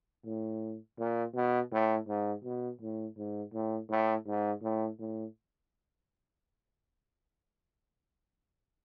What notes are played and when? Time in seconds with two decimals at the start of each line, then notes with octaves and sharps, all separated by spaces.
0.25 A2
0.99 A#2
1.35 B2
1.72 A2
2.08 G#2
2.44 B2
2.81 A2
3.17 G#2
3.54 A2
3.90 A2
4.27 G#2
4.63 A2
4.99 A2